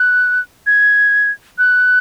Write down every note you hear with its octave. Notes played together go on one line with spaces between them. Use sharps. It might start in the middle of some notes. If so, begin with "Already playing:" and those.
Already playing: F#6
G#6
F#6